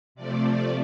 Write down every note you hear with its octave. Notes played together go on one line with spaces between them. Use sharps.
C3 F3 A3 D5
D5